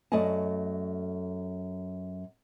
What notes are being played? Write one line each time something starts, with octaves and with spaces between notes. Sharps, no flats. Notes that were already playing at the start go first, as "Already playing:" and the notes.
F#2 A3 D5 D#5 A5